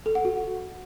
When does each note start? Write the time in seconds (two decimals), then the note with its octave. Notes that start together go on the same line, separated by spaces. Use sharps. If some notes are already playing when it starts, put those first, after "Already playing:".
0.06 A4
0.15 F#5
0.25 F#4